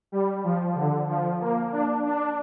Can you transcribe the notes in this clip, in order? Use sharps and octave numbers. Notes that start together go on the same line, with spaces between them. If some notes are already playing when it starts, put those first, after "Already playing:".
G3
F3
D3
F3
A#3
D4
D4